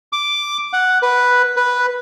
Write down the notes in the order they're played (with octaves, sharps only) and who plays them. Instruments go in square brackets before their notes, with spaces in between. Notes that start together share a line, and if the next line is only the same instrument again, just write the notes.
[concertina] D6
F#5
B4
B4